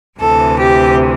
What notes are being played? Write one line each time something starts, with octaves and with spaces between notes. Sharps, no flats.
D2 C3 E3 A4
G4